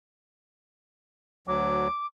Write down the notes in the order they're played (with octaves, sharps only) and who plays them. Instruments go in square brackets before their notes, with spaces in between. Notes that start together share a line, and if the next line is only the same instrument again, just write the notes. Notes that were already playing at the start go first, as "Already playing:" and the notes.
[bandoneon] D2 F#3 [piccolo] D6